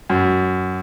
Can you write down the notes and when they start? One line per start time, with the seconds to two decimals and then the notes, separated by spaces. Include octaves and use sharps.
0.10 F#2